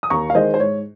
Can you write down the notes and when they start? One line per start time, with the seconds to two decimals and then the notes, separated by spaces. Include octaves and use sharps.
0.03 D#6
0.10 D#2 A#5 C#6
0.30 F5
0.35 D#3 G#3 C5 D#5
0.54 C5
0.60 G#2 C#5